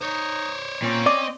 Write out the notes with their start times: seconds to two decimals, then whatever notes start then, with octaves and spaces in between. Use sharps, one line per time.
0.01 D#4 C5 C#5
0.82 A#2 C4 C#4
1.06 D5 D#5 D6